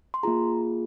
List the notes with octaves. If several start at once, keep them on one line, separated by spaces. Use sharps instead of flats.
C6
A#3 F4 G#4 A#5